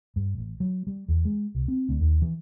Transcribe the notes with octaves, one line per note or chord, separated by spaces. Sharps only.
G2
A1
F#3
G3
E2
G#3
C2
C4
D2
D#2
E3